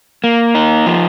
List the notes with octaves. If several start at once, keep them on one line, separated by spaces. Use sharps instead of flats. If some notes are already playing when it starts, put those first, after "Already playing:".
A#3
D#4
F3